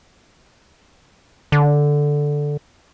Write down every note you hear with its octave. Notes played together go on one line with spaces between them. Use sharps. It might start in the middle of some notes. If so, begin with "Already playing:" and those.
D3